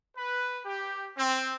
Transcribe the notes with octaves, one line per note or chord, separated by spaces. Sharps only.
B4
G4
C4